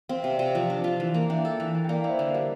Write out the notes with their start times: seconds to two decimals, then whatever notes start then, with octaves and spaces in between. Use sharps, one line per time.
0.09 C4 F5
0.22 C3 E5
0.35 C3 D5 F5
0.55 F3
0.70 D4
0.84 F4
1.00 E3
1.14 A#3
1.29 D4 E5 G5
1.45 A4
1.60 E3
1.75 A#3
1.84 G5
1.89 A#3 D5 F5
2.04 E4 D5
2.09 C5 E5
2.19 D3
2.29 A#4 D5
2.34 G3